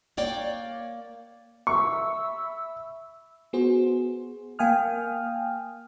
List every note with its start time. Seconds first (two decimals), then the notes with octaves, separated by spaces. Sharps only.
0.17 A#3 C#5 D5 G5
1.67 E5 B5 C#6 E6
3.53 B3 F#4 G#4 C5
4.59 A#3 F5 G5 G#5 D#6 F6